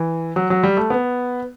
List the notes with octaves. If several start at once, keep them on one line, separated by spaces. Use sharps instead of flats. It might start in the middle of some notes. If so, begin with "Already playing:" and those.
Already playing: E3
F#3
F#3
G3
A3
B3